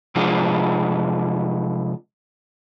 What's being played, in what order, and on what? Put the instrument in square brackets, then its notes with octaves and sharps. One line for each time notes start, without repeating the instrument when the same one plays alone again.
[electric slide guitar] C3 F3 G#3 D4 F4